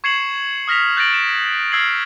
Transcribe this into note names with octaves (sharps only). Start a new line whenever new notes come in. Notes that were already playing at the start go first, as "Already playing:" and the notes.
C#6 G#6 C7 C#7 E7 F#7
D#6 F6 A#6 B6 F7
F#6 G6 A6 A#6 D7 F#7
E7
E6 F6 G#6 C7 D7 F#7